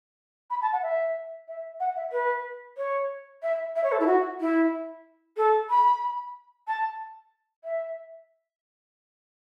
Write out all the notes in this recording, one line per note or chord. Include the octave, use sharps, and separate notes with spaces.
B5
A5
F#5
E5
E5
F#5
E5
B4
C#5
E5
E5
C#5
A4
E4
F#4
E4
A4
B5
A5
E5